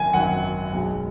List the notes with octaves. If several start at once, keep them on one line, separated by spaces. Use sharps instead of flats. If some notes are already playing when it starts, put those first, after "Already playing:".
Already playing: G#1 F#2 D#3 G#5
G#1 F#2 D#3 F#5
B1 B2 G#3